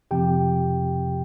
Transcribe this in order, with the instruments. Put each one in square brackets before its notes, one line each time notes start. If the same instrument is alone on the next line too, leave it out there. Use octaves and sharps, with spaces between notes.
[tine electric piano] F2 C3 F3 C4 G4 G5